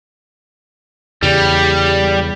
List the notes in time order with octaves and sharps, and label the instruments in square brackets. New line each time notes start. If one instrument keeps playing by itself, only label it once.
[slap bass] E2 C#3 [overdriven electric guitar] G3